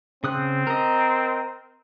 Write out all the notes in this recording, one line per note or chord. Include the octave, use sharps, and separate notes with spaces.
C#3 C4 D#6 F#6
A#4 D#5